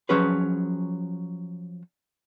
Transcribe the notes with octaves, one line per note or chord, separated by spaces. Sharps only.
F3 F#3 C#4 G#4 B4